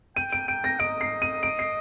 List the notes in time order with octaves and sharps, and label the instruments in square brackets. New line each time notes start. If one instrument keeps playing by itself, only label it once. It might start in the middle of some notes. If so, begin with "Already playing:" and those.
[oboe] G5 [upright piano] D#7
[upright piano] D7
[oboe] G5 [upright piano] D7
[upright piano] A#6
[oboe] D#5 [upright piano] D7
[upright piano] C7
D#7
D7
C7